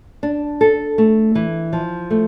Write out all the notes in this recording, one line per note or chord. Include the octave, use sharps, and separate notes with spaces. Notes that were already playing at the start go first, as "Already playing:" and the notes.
D4
A4
A3
E3
F3
A3